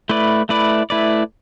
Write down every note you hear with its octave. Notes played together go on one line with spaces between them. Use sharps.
A3 E4 B4 D5
A3 E4 B4 D5
A3 E4 B4 D5